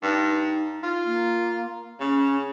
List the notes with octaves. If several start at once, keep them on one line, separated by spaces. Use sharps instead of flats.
G2 D#4
F4
A#3
C#3 C#4